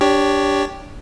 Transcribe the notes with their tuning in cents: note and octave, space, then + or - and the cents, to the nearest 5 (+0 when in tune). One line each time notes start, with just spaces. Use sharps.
D4 -15 G4 +0 C#5 +5